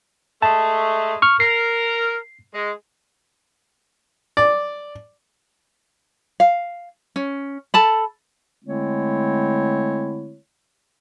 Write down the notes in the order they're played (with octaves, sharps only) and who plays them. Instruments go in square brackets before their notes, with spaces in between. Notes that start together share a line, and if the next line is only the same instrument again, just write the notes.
[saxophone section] G#3 A3 [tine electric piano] A5
[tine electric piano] C#6 F6
[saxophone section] A#4 [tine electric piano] C7
[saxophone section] G#3
[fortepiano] D5
[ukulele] F5
C#4
A4 A5 B5
[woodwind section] D3 G#3 A3 C4 E4 C#5